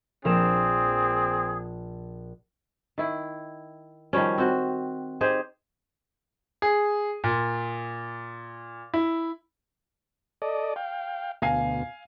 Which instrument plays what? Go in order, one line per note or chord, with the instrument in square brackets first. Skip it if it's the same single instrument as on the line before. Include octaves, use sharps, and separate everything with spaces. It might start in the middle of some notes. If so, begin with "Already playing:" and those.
[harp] A#1 A#4 E7 [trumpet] C4 [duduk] G#4
[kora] D#3 E4
D#3 F3 G3 C#4
C4 F#4
D#4 G4 G#4 C5
[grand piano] G#4
A#2
E4
[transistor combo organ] A4 D5 D#5
F5 G5
[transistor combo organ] D2 B2 [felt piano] F5 G#5 C7